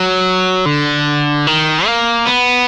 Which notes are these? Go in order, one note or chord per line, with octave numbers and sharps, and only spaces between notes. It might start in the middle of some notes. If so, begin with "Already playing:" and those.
Already playing: F#3
D3
D#3
A#3
B3